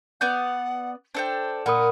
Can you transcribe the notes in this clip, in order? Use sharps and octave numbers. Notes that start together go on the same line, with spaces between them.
B3 D5 F#5 G6
D4 A4 C5 G5
A#2 A#4 F#5 B5 D#6